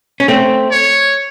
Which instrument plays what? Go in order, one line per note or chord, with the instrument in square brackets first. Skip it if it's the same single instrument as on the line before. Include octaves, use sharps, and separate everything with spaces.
[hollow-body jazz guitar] C#4
A3 C4
[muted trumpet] C#5